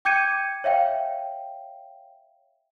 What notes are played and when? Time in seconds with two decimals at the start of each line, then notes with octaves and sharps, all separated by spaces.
0.05 G5 D6 G6 G#6 C#7 D#7
0.64 C#5 E5 F5 G5